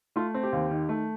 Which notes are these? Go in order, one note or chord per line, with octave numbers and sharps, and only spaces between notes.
A3 F4
C4
G4
D#2
D#3
A3